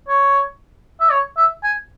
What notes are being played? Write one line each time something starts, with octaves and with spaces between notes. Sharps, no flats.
C#5
E5
C#5
E5
G#5